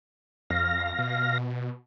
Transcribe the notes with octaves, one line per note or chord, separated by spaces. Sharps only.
F2 F5 A#6
B2